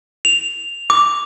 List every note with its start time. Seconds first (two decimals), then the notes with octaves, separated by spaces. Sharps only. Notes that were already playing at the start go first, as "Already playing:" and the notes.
0.25 F7
0.90 D6